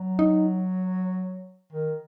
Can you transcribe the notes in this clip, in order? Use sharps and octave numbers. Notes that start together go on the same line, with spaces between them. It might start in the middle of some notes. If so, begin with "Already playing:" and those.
Already playing: F#3
D#4
D#3